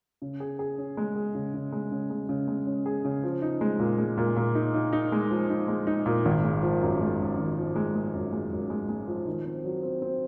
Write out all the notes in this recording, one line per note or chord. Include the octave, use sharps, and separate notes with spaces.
C#3
G#4
G#4
C#4
G#3
G#4
C#3
C#3
G#3
C#3
G#3
C#3
G#3
C#4
G#4
C#3
F3
D#4
G#3
A#2
G#3
A#2
A#2
D#4
D#4
D#4
G#3
F3
D#4
G#3
D#4
A#2
G#1
G#3
F3
F#2
G#3
F#2
G#1
F3
G#3
G#3
F#2
G#3
F#2
G#3
G#3
F3
D#3
C4
F#3
C4
C4